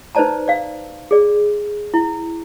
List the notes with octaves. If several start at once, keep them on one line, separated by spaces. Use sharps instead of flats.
D#4 B4 C5 D5 A5 A#5
D5 F5
G#4 D5
E4